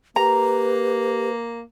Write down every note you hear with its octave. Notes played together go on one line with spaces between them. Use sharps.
A#3 G4 B4 A#5